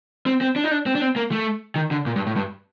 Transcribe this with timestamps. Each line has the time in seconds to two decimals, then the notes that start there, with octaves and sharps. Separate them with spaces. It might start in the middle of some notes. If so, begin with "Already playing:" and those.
0.26 C4
0.41 C4
0.56 D4
0.64 D#4
0.71 D4
0.86 C4
0.95 D4
1.01 C4
1.16 A#3
1.31 A3
1.76 D#3
1.91 D3
2.06 A#2
2.16 G2
2.26 A2
2.36 G2